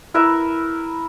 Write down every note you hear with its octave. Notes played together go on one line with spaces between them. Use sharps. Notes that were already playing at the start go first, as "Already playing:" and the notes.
E4 A#4 B4 E5